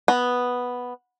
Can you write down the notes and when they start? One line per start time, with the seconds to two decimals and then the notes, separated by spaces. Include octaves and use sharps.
0.08 B3